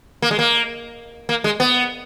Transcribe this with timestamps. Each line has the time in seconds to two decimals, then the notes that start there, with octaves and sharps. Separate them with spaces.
0.22 A#3
0.31 G#3
0.39 A#3
1.29 A#3
1.44 G#3
1.60 B3